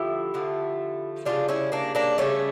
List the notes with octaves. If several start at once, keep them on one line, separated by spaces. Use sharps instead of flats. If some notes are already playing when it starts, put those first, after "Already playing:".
Already playing: D3 F3 A3 E4 G4
D3 F3 A3
C#3 G3 D4 F4
C#4 E4
A#3 D4
A#3 D4
C#3 G3 A3 C#4